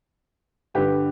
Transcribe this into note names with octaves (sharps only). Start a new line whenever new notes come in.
G1 G2 D3 G4 B4